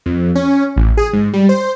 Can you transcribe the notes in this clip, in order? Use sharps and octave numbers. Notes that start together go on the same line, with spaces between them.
F2
C#4
A1
G#4
G#2
G3
C5